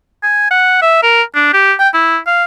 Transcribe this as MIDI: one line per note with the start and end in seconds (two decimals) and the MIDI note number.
0.23 0.46 80
0.50 0.78 78
0.82 1.02 76
1.03 1.22 70
1.35 1.50 62
1.53 1.73 67
1.79 1.89 79
1.94 2.17 64
2.26 2.45 77